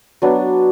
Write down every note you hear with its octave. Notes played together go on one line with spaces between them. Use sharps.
F#3 B3 D4